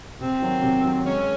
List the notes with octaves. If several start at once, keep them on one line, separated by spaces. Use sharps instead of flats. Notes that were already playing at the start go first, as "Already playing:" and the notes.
C3 C4
D#3 F#3
C3
D#3 F#3
G#3 C#4